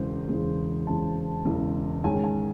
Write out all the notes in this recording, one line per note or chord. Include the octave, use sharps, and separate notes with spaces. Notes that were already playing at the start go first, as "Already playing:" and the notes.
Already playing: E1 E2 C#3 G#3 C5
E1 E2 C#3 G#3
E1 E2 C#3 G#3 A5
E1 E2 C#3 G#3
G#2 D#3 G#3 C#4 G#5
G#5